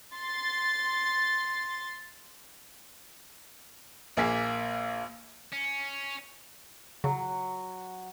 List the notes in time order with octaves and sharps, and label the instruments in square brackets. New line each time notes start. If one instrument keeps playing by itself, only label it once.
[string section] C6 A6
[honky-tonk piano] A#1 A#3 G#4 B6
[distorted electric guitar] C#4
[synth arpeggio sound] C#3 [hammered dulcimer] F#3